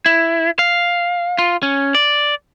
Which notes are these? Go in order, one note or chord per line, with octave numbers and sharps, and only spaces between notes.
E4
F5
F4
C#4
D5